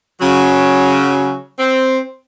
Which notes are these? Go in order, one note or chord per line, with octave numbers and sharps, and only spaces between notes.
C#3 F#3
C4